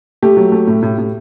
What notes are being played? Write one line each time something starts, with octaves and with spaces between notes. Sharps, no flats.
A3 G4
F#3
A3
A2
A2
A2